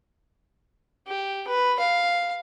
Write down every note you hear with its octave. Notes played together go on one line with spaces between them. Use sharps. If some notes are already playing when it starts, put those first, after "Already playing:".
G4
B4
F5